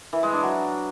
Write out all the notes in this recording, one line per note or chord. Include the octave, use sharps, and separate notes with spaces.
E3
G#3
D4
F#3